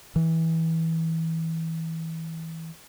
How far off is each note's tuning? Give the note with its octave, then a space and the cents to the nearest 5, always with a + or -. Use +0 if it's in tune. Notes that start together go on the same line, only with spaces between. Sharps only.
E3 -20